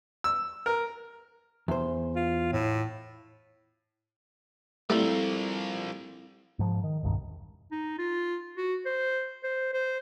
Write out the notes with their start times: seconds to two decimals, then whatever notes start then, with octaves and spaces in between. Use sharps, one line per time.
0.24 E6
0.66 A#4
1.68 E2 C5
2.16 F4
2.53 A2
4.90 F3 G3 A3 A#3 C4 E4 A4
6.59 G#2 F3
6.84 D#3
7.03 E1 C2 G2 D#3
7.72 D#4
7.99 F4
8.57 F#4
8.86 C5
9.44 C5
9.74 C5